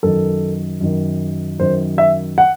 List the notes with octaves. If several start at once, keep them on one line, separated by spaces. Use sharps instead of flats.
F#2 D#3 A4
F#2 D#3
F#2 D#3 C5
E5
F#5